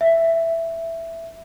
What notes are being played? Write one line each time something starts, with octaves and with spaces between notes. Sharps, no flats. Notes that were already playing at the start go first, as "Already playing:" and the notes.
E5